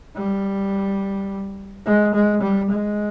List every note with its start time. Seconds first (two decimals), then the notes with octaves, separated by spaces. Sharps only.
0.16 G3
1.86 G#3
2.14 G#3
2.42 G3
2.70 G#3